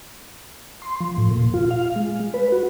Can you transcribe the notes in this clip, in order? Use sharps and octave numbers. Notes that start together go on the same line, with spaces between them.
C6
F3
A2
A#2
F4
F5
G#3
B4
F#4